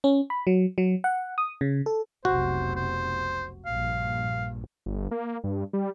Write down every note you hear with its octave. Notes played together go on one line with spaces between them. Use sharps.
C#4
B5
F#3
F#3
F#5
D#6
C#3
A4
F1 B1 C3 F#4 C5
C5
A#1 G2 F5
G1
A#3
G2
G3